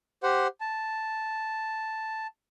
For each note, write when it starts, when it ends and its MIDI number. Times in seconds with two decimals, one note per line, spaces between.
0.23 0.47 67
0.23 0.47 72
0.23 0.47 78
0.61 2.27 81